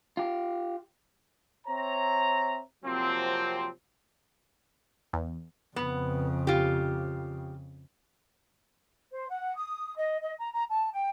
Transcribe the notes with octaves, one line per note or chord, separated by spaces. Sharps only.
F4 G4
C4 C#5 E5 A#5
C3 F3 F#3 A#3 C4
E2
F2 C#3 B3
F4 G4
C5
F#5
D#6
D#5
D#5
A#5
A#5
A5
G5